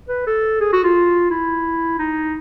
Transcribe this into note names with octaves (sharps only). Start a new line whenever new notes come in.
B4
A4
G#4
F#4
F4
E4
D#4